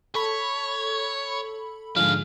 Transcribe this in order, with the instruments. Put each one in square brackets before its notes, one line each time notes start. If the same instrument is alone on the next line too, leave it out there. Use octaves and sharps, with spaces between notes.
[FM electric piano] A4 B5 [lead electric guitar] C#5
[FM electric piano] G#2 D3 F3 [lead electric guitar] D4 G#4 [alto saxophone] F5